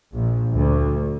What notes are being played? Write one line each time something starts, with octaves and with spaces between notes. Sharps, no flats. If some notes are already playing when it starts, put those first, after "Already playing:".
A#1
D2